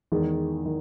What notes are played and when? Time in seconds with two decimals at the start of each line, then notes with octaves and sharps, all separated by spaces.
0.12 E2 D#3 G#3
0.65 D#3